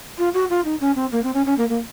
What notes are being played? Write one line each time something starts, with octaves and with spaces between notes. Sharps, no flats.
F4
F#4
F4
D#4
C#4
C4
A#3
C4
C#4
C#4
A#3
A#3